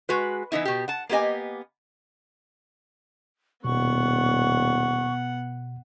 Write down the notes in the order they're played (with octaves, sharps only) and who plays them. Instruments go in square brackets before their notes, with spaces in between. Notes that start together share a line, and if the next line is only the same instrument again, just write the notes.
[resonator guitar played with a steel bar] G#3 F#4 B4
E3 B3 D#4 E4
B2 G4
F#5 A5
A#3 B3 G4 D#5 G#5
[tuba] D#1 [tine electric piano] B2 [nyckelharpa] B3 F#5 [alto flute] C#6